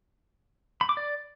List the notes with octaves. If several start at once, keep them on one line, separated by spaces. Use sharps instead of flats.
B5
D6
D5